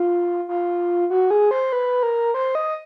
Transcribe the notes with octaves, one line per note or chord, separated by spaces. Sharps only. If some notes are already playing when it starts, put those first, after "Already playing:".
Already playing: F4
F4
F#4
G#4
C5
B4
A#4
C5
D#5